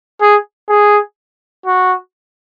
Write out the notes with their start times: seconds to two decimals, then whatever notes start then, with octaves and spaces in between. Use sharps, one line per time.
0.21 G#4
0.69 G#4
1.66 F#4